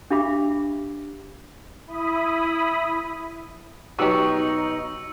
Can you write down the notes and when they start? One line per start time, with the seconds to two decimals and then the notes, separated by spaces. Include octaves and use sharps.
0.10 D4 G4 E5 F5 B5 D6
1.87 E4 B5 D#6
3.99 B2 F#3 D#4 F#4 G4 C#6 E6 C#7